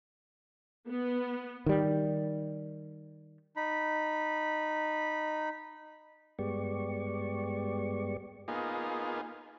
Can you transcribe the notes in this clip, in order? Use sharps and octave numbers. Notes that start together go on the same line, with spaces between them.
B3
D#3 G3
D#4 B5
G2 G#3 B3 G4 D5 C#6
A#3 B3 D#4 F4 G#4